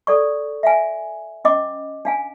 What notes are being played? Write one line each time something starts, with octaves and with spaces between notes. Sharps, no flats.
A4 D5 C#6
E5 F5 G#5
C#4 D#5 D6
D4 F5 G#5